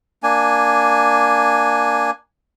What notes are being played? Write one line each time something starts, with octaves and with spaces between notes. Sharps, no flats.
A#3 D4 G#5